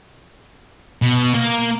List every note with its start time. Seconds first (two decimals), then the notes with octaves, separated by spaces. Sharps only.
1.02 B2
1.34 A#3